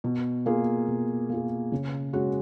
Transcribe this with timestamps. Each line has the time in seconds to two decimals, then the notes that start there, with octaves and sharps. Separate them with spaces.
0.04 B2
0.46 A#3 F4 G#4
0.88 B2
1.29 A#3 F4 G#4
1.72 C#3
2.13 G#3 C#4 F#4